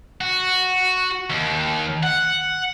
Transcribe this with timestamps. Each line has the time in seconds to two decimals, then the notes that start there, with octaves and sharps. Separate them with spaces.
0.21 F#4
1.30 D#2
2.03 F#5